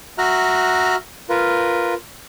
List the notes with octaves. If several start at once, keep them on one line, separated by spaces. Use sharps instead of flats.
F#4 E5 A#5 F6 F#6
F4 A#4 B4